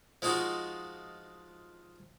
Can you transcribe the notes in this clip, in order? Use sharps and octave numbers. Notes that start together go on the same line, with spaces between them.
F3 G#3 D#4 F4 F#4